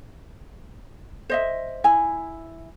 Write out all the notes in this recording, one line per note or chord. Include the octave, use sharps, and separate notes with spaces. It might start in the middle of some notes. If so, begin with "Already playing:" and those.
C5 D#5 E5
E4 G#5